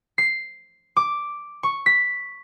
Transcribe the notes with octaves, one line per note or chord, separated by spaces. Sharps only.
C7
D6
C#6
B6